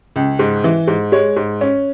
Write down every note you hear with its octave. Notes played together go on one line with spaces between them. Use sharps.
C#2
G#2
E3
G#2
G#3 C#5
G#2
C#4